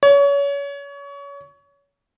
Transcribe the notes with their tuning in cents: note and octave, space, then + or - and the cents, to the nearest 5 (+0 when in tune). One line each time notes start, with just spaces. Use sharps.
C#5 +30